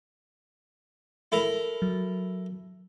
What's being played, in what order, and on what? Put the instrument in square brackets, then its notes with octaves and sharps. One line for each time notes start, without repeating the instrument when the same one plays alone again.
[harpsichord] E4 A4 A#4
[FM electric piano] F#3